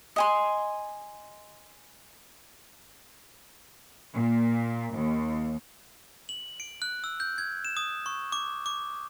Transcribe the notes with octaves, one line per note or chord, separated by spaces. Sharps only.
D#5 G#5 C6
A#2
D#2
F#7
D7
F#6
E6
G6
G#6
E7
D#6
C#6
D6
D6